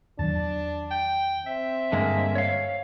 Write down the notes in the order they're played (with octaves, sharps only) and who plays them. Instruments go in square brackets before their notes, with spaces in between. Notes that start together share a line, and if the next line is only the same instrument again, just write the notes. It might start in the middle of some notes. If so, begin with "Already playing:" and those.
[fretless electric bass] E2 D#3 F#3 [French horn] D4 [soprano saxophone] A5
[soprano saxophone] G5
[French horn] C4 [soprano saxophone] E5
[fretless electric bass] G2 [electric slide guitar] D3 G#3 A#3
[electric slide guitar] C#5 F5